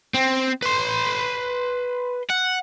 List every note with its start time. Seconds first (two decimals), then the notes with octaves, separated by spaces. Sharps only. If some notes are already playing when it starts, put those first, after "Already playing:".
0.14 C4
0.62 B4 C6
2.30 F#5